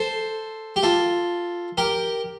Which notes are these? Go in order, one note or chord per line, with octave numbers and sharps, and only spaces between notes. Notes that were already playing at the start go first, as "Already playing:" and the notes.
Already playing: A4 C5
G4
F4 A4
G4 A#4